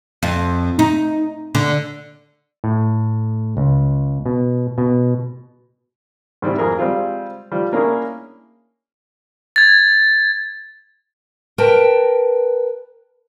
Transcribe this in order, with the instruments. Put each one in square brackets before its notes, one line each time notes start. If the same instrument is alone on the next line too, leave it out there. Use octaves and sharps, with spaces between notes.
[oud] F2
D#4
D3
[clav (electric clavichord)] A2
C#2
B2
B2
[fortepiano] G#2 G3 C4 E4
F2 G#4 A#4
G3 G#3 C4 F4
F3 G3
A#3 C#4 D4 E4 G#4 A#4
[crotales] G#6 A6
[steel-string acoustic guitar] A#4 B4 G5 A5